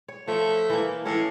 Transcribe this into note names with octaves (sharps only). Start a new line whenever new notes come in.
C#5
F3 A3
E3 A#3
A2 E3 A3 C#4